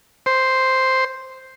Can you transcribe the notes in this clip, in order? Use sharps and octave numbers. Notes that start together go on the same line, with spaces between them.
C5